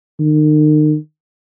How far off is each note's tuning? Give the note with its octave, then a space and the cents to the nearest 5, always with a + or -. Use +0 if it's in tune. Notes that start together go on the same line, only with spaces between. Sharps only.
D#3 -35